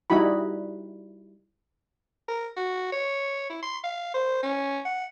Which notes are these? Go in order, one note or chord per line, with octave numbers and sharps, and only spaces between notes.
G3 D#4 E4 F#4 B5
A#4
F#4
C#5
E4
C6
F5
C5
C#4
F#5